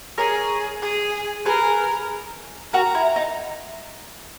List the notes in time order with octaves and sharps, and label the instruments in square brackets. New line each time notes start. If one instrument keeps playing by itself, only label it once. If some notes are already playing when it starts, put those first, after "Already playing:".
[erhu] G#4 [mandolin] A#4 C#5
[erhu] G#4
[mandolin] G#4 B4 [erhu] A#4
[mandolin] F#4 A#4 [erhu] A#5
[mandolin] E4
D#4